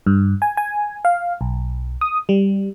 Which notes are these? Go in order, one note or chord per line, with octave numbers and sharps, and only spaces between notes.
G2
G#5
G#5
F5
B1
D#6
G3